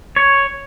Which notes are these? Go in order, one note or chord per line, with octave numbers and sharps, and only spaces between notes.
C#5